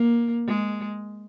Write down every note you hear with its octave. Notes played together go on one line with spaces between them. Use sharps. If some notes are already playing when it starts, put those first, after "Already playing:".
Already playing: A#3
G#3